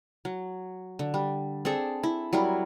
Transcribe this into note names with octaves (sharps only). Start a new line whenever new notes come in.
F#3
D3
G3
C4 D4 G#4 A4
E4
F#3 G3 E4 A#4